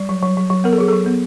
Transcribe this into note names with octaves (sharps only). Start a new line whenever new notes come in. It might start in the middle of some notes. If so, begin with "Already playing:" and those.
Already playing: G3
F#3
F#3
F#3
F#3
B3 A#4
A4
F#3 G#4
F#3 A4
B3